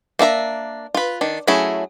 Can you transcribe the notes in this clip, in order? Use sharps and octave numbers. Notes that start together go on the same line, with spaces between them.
A#3 D4 E5 A#5
F4 B4
D#3 D4
F#3 A3 C#4 E4 G#4